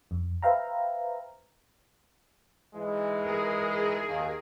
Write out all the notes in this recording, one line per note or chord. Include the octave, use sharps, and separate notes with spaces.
F2
B4 C5 E5 F5 G5 A#5
G#2 E3 G#3
G#4 A#4
D#2